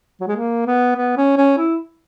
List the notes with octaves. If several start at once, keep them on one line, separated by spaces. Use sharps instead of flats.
F#3
G#3
A#3
B3
B3
C#4
C#4
E4